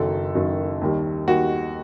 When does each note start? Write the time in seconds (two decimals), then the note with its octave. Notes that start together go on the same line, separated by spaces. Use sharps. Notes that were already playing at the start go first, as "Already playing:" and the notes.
Already playing: F#1 F#2 D#3 F#3 A4
0.34 F#1 F#2 D#3 F#3
0.82 D#2 D#3 G3
1.27 D#2 D#3 G3 F#4